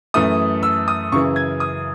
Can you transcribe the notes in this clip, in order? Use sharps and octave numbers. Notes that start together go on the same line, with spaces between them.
F#2 E3 A3 D#6
E6
D#6
F#2 C#3 E3 C#6
G#6
D#6